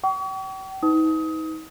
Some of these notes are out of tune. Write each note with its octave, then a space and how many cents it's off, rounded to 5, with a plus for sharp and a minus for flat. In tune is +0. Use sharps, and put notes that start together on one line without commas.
G5 -40 C#6 +40
D#4 +35 B4 +35 D#6 +25